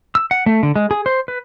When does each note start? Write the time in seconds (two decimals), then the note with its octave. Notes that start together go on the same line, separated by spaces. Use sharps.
0.15 E6
0.31 F#5
0.46 A3
0.63 D3
0.76 G#3
0.91 G#4
1.06 C5
1.28 B4